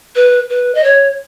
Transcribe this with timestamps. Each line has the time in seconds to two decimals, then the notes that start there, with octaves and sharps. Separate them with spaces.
0.16 B4
0.50 B4
0.75 D#5
0.84 C#5